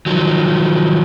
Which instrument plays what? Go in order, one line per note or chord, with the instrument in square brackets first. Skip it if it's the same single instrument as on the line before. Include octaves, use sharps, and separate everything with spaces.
[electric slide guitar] D#3 F3 F#3